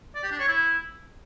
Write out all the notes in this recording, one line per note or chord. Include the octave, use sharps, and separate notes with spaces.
D5
G4
D4
C#5
E4